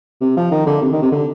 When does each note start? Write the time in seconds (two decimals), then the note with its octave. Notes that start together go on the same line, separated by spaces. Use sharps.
0.21 C3
0.37 F3
0.51 D#3
0.67 D3
0.82 C3
0.92 D#3
1.02 C3
1.12 D3